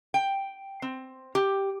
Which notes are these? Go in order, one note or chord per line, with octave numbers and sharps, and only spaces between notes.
G5
C4
G4